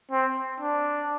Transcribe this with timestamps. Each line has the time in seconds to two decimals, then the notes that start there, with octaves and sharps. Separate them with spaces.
0.11 C4
0.60 D4